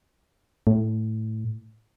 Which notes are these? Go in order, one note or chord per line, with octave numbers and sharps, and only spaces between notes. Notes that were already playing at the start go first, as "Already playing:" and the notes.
A2